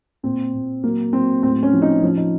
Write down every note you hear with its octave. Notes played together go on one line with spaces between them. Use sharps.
A#2 C4
A#2
F#3 A#3
F#3 C4
A2 C4
C#4
F3
D#4
F3 C#4
D#4